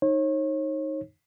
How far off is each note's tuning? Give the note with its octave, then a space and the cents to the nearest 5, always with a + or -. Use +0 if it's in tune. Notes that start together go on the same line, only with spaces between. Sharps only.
D#4 +0 C#5 -35